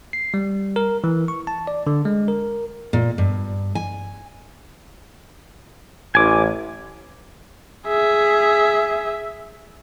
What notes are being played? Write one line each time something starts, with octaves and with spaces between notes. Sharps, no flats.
C7
G3
A#4
E3
C#6
A5
D5
D3
G#3
A#4
A#2
G2
G#5
A1 G#5 D6
G#4 E5